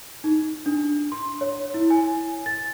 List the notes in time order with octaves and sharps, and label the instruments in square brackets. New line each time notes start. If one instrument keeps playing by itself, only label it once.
[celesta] D#4
D4
C6
C#5
E4
G#5
A6